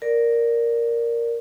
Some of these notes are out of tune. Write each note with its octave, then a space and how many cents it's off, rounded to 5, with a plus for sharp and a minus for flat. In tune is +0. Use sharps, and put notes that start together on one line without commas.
A#4 +0 D5 +0